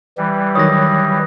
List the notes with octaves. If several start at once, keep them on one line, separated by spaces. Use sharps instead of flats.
E3 G3
D#3 F#3 C#5 D#6 A#6